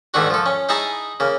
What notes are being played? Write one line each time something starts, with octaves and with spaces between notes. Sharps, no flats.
G#2 D3 D#3 A3 D4 F#4
F3 A4
C#4
D#4 E4 G#4 A5 A#5
C#3 A#3